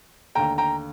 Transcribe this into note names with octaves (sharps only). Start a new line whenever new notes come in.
D#2 D3 A3 G5 A#5
G5 A#5